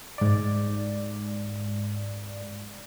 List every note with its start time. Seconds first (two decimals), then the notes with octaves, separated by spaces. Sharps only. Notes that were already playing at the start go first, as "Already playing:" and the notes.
0.18 G#2 D5